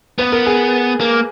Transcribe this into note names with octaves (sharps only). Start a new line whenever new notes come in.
B3 B4
A#4
G#4
A#3